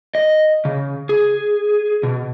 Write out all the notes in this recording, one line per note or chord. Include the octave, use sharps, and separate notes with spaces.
D#5
C#3
G#4
B2